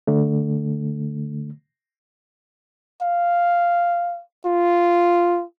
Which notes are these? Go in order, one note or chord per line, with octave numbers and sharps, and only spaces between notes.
D3 A3
F5
F4